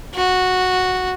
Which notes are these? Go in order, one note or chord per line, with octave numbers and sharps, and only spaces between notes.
F#4